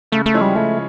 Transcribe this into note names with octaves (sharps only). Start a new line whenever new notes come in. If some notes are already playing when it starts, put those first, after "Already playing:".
C#3 A3
A3
F3 G#3 C#4 E4
G3
C#3 A3